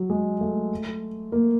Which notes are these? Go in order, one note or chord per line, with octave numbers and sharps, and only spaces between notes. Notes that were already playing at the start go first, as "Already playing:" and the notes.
Already playing: F#3
G#3
A3
A#3